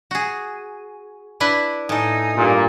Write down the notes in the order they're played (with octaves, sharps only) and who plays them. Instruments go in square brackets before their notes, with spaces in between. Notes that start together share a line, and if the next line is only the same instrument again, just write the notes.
[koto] F#4 G#4
D4 E4 B4
[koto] A2 A4 [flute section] D#4 G#5 D#6
[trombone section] G2 A#2